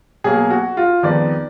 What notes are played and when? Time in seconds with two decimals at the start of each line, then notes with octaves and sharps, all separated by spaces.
0.24 B2 F#3 A#3 G#4
0.50 F#4
0.77 F4
1.03 F2 D#3 G#3 B3 D5